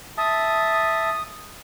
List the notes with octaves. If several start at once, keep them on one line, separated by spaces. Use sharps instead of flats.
E5 A5 D#6